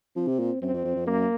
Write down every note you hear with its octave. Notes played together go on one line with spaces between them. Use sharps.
F3 C4
C3
A#2
F#2 C4
F2
F2
F2
F#2 A#3